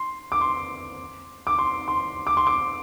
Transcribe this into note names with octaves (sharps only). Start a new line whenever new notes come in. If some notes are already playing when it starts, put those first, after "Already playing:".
Already playing: C6
D6
C6
D6
C6
C6
D6
C6
D6